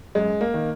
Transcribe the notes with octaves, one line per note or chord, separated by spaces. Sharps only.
F#2 G#3
A#3
D#3